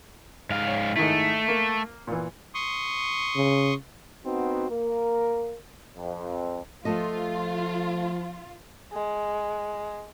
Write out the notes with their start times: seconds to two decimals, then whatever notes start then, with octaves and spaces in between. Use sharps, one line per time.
0.50 G#2 F5
0.67 C#5
0.96 G#2 D#3 A3 E4
1.48 A#3
2.07 A#2 E3
2.54 C6 C#6 D#6
3.36 C#3
4.25 B3 C4 D#4 F#4
4.70 A#3 A#4
5.96 F2
6.85 F3 A3 F4 A4 D#5
8.93 G#3